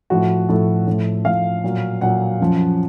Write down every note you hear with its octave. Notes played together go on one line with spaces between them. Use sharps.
A2 F3 F#4
A2 F3 A4
A2 F3
A2 F3 F5
A#2 F#3
A#2 F#3 F#5
F#2 F3